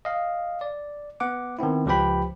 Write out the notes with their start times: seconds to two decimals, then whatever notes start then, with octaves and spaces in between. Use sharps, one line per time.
0.05 D#5 F5
0.61 D5
1.20 B3 F#5 D6
1.59 D#3 B3 C4 E4
1.86 C#2 F3 G4 B4 G5 B5